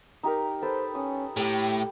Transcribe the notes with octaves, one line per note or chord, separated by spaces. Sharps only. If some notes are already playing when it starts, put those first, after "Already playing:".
D#4 G4 A#4
A4 B4 C5 G5
C#4 D#6
A2 G4 G5 A5 D6